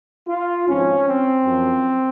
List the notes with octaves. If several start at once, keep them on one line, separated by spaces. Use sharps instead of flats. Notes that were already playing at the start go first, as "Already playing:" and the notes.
F4
G#1 G#2 F3 C#4
C4
F#2 F3